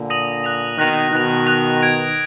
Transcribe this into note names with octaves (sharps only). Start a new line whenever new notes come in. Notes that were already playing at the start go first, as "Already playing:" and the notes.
Already playing: A#2 D3
D#6 A#6 D#7 F#7
F#6 A#6 F7
B2 D#3 F#6 A#6 F7
B2 D#3 F#6 A#6 F7
F#6 A#6 F7
G#6 D7 F7